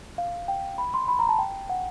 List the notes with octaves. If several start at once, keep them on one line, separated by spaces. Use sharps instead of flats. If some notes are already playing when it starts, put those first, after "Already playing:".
F5
G5
B5
C6
B5
A#5
A5
G5
F#5